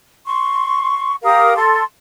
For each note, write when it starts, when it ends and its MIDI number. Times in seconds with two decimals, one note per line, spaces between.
0.25 1.14 84
0.25 1.14 85
1.23 1.55 67
1.23 1.55 70
1.23 1.55 77
1.23 1.55 87
1.56 1.82 69
1.56 1.82 84